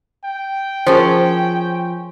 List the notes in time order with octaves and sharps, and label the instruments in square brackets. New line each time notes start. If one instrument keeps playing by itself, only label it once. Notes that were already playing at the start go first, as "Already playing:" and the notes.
[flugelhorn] G5
[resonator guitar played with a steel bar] F3 C#4 [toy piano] G#4 A#4 C5